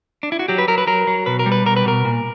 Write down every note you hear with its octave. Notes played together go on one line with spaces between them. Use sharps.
D4
E4
F#4
F#3 G4
B4
F#3 A#4
B4
F#3 A#4
F#3
B2 B4
A#4
G3
B4
B2 A#4
B4
B2 A#4
A#2